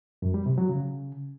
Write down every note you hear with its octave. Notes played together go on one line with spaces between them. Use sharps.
F#2
G3
C3
F#3
C#3